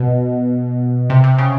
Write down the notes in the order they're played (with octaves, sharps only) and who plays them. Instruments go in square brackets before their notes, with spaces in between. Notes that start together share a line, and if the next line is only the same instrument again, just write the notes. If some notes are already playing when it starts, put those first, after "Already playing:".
Already playing: [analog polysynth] B2
C3
C3
C#3